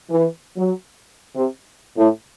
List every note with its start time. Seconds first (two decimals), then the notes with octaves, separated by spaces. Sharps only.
0.10 E3
0.57 F#3
1.35 C3
1.98 A2